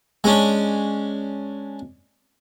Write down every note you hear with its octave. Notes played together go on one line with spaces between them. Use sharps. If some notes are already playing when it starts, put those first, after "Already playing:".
G#3 C#4 D4